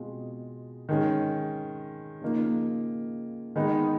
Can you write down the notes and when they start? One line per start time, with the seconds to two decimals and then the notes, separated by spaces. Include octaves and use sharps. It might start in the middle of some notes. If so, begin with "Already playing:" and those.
Already playing: B2 G#3 C4 F4
0.89 D#3 G#3 C#4
2.22 C#3 F3 A#3 D#4
3.56 D#3 G#3 B3 D#4